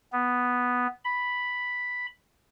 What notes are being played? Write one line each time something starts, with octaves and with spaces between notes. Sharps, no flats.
B3
B5